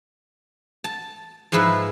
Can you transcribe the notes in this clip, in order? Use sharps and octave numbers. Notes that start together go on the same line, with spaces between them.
A5
G#2 F3 G#3 E4 B4